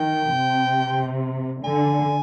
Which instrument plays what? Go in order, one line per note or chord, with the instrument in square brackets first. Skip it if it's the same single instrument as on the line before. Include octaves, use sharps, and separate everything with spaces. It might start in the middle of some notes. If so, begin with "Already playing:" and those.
Already playing: [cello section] D#3 [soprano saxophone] G5
[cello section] C3
[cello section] D3 [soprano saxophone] G#5